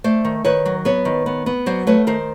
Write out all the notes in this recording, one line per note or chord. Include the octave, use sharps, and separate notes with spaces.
A3 C5 D5
D#3
D#3 B4 C#5
F#3
B3 B4 C#5
D#3
B3
B3
F#3 C5 D5
A3 B4 C#5
D#3 A#4 C5